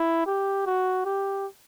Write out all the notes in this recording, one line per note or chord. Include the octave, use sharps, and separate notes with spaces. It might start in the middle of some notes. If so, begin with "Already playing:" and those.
Already playing: E4
G4
F#4
G4